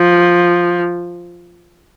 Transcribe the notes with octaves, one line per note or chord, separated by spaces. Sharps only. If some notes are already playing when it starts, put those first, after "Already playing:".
Already playing: F3